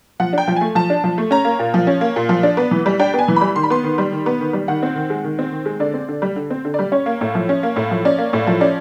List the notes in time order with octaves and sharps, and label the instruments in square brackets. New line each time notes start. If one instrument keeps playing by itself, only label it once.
[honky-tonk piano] F3 F#5
D4 G5
F3
A3 G#5
F3 A5
D4
F3
A3
C#4 A#5
A#3
A#2
F3
C#4
A#3
A#2
F3
D4
B3
E3
G3
D4 G5
B3 G#5
E3
G3 B5
D#3 C6
B5
B3 C6
D#3
G3
D#3
B3
D#3
G3
D#3 F#5
C4
D#3
G#3
D#3
C4
D#3
G#3
D3 D5
C4
D3
G3
D3
C4
D3
G3 D5
C#4 C#5
A#3
A2
F3
C#4
A#3
A2
F3
C#4 D5
A#3
A2
F3
C#4 D5